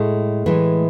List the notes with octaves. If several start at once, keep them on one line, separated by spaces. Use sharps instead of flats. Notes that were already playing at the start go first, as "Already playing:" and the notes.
Already playing: A2 G#3 A3
A2 E3 G#3